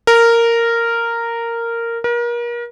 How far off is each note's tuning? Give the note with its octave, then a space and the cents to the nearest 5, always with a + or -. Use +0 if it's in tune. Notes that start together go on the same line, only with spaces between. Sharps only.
A#4 -10
A#4 +35